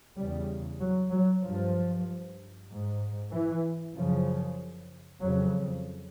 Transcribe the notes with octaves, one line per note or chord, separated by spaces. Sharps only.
E2 C#3 G3
F#3
F#3
G2 F3
G#2
E3
F#2 C#3 F3
F2 C#3 F#3